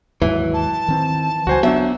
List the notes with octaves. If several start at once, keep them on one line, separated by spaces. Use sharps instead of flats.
D#2 G#2 E3 F#3
A5
D#3 C4
C#2 F#3 F#4 C5 G#5
F#3 B3 D4 E5